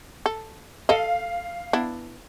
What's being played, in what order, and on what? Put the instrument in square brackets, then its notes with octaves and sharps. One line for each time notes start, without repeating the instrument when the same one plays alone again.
[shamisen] A4
[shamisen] A4 D#5 [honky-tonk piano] F5
[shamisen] B3 D4 E4